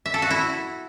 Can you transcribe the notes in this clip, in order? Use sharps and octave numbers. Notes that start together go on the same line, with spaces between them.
E5
A4
F#4
E4